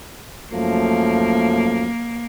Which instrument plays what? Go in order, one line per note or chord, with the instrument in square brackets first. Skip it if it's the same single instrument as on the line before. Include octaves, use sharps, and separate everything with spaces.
[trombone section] F#2 F3 A3 [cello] A#3